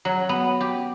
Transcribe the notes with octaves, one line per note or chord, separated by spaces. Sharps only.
F#3
B3
G4